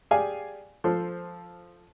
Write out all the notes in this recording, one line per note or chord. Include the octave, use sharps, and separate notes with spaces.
G4 G#4 D5 F5 G#5
F3 A4 C5